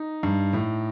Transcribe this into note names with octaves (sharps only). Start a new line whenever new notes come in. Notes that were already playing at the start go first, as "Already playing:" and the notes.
Already playing: D#4
G2
A2